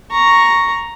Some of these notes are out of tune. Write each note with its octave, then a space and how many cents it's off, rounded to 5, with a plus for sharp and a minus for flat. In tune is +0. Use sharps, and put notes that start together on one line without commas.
A#5 +0 C#6 +0